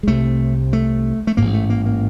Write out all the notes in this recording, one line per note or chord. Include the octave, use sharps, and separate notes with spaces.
G#3
C2 C3 A3
A3
A3
A1 G#2 A#3
A3
A#3
A#3